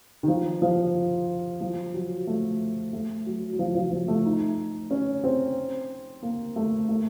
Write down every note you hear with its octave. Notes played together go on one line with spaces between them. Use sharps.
D#3
F3
F3
F3
F#3
A3
A3
F#3
F#3
F3
F3
F3
A3
D#4
C#4
C4
A#3
A3
A3